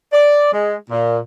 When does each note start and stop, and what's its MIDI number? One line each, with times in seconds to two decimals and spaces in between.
0.12 0.52 74
0.53 0.76 56
0.90 1.18 46